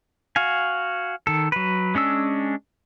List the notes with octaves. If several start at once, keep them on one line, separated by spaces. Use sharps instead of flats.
F#4 F5 G#5
D#3 A4
F#3 B4
G#3 C#4 D4 E6